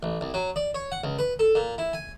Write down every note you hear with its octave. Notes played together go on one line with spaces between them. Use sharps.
A1
C2
F#3
D5
C#5
F#5
C#2
B4
A4
A#2
E4
G#5